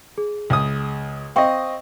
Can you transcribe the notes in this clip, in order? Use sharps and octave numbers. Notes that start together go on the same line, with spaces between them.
G#4
C#2 D#6
C4 D#5 F5 G5 C#6